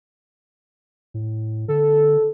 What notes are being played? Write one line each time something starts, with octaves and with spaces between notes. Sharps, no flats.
A2
D3 A4